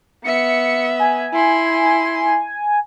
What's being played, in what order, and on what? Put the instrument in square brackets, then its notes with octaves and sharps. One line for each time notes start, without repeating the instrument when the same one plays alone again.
[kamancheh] B3 E5 [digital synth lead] C#7
[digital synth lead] G#5
[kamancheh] E4 C6